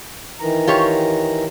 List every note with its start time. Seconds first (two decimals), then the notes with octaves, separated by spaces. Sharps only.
0.40 D#3 E3 A#5
0.67 F4 G4 C#5